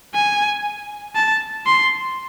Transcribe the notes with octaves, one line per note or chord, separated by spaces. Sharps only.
G#5
A5
C6